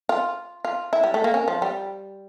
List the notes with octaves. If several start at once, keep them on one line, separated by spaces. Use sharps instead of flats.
F4
F4
E4
G3
A3
A#3
C#4
F3
G3